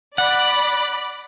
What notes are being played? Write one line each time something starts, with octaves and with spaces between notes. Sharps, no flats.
D5 F#5 B5